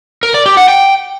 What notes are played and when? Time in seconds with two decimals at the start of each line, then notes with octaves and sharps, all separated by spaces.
0.23 A#4
0.34 D5
0.46 G4
0.57 F#5
0.68 G5